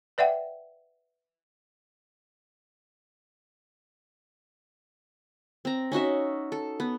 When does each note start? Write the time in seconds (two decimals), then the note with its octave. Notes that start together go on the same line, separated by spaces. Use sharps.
0.18 B4 D5 E5 F#5 G5
5.65 C4 A#5
5.92 C#4 D#4 F#4 E5
6.52 A4
6.80 B3